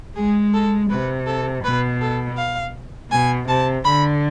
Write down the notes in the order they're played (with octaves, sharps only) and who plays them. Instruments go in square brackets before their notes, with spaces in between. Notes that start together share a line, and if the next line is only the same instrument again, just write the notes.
[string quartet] G#3 [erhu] G#4
[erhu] A4
[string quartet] C3 [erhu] B4
[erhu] A4
[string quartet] B2 [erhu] B4
[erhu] A4
F5
[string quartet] B2 [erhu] G#5
[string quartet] C3 [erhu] A5
[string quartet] D3 [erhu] B5